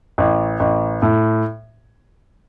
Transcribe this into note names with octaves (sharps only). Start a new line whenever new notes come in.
A1
A1
A2